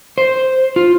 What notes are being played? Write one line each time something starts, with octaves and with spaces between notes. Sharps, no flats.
C5
F4